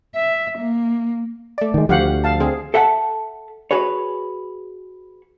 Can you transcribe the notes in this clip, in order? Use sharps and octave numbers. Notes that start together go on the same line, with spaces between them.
E5
A#3
A3 D5
D#3 G#3
D2 F3 G4 F5 F#5
F5 A5
D3 C4 G#4
A4 E5 F#5 G5 A5
F#4 G#4 B4 C#5